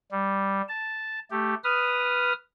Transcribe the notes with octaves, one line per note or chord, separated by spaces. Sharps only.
G3
A5
A3 G4
B4 D#6 F6